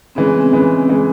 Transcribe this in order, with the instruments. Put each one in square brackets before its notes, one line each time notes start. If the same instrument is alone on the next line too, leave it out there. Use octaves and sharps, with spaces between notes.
[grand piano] C#3 E3 G#3 [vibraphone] C4
[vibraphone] B3
C4
[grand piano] C#3 E3 G#3
C#3 E3 G#3